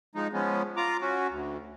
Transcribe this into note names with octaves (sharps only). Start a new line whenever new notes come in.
F3 G#3 D#4
F3 G#3 B3 C#4
F4 A#5 D6
C#4 F#4
D2